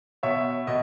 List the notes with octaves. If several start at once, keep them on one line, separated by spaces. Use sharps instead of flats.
B2 C#5 E5
B2 D#5